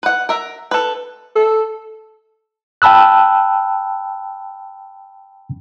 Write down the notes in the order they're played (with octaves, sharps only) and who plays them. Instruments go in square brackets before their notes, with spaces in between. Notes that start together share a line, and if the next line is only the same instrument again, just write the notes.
[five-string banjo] B4 F#5
A#4 E5
A4 B4
[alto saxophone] A4
[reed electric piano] G5 A5 B5 E6 F#6